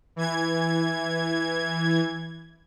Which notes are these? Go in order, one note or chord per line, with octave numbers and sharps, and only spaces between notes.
E3 G#6